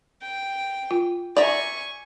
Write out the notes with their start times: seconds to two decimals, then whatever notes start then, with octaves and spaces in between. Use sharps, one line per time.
0.22 G5
0.91 F4
1.37 D5 E5 G#5 A#5 C#6